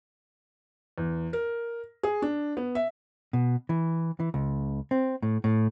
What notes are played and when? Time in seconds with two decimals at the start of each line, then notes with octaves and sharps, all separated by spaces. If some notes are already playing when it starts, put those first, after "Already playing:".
0.98 E2
1.33 A#4
2.03 G#4
2.22 D4
2.57 B3
2.75 E5
3.33 B2
3.69 E3
4.20 E3
4.34 C#2
4.91 C4
5.22 A2
5.44 A2